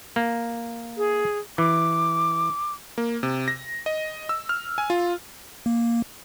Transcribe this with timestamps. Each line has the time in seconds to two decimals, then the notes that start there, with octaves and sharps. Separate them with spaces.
0.16 A#3
0.97 G#4
1.58 E3 D6
2.98 A#3
3.23 C3
3.48 A#6
3.86 D#5
4.29 E6
4.49 F6
4.78 G#5
4.90 F4
5.66 A#3